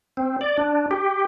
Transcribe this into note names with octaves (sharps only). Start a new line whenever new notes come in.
C4
D5
D4
G4